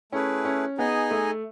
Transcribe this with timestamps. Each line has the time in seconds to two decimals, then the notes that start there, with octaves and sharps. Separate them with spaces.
0.12 A3 C#4 E4 G#4 B4
0.45 C#4
0.78 B3 D#4 G#4 D#5 G#5
1.11 A3